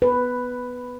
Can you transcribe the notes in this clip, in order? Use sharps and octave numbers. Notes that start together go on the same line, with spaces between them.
B4